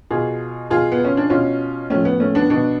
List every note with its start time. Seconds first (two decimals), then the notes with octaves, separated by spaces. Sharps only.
0.11 B2 F4 G#4
0.70 B2 F4 G#4
0.92 B3
1.05 C#4
1.17 D4
1.30 B2 C#4 F4
1.90 A2 F3 A3 C#4
2.05 B3
2.20 A3 C#4
2.35 B3 D4
2.50 B2 B3 D4